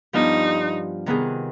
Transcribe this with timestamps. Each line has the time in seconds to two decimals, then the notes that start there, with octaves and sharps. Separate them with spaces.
0.13 G2 F3 B3 D4 D#4 F4
1.06 C3 D#3 B3 F4 G#4